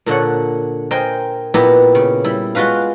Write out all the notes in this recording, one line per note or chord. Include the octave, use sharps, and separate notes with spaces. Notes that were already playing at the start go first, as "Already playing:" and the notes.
A#2 D3 C#5 F#5
A#4 C5 D#5 G5 G#5
A#2 B3 E4 G4 A#5
C#3
G3 E4
G#3 F4 F#4 B4 F5